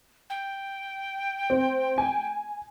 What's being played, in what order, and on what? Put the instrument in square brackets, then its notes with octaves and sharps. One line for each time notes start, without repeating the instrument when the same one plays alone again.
[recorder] G5
[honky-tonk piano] C4
G#5